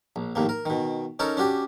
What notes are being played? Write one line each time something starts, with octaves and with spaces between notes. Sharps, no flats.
A#1
A#1 D#2 A2 A#3
A#4
B2 D#3
C#4 D#4 A4 A#4 C#5
C#4 D4 F#4 G4